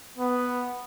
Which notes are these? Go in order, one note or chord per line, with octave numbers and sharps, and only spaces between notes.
B3